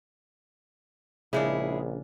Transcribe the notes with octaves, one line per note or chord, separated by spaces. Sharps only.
A#1 C#3 G#3 D4 E4